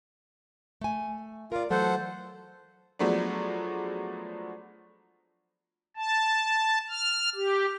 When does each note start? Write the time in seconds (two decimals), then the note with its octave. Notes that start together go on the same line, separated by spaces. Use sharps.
0.81 A3 G#5
1.52 F4 A#4 D5
1.71 E3 F#3 A3 A4 C5 F#5
2.99 F3 F#3 G#3 A3 B3 D4
5.96 A5
6.90 F6
7.35 G4